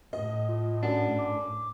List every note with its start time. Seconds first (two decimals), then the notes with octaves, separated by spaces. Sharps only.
0.13 A2 D#5
0.48 F4
0.83 F#2 D4 F#5
1.19 D6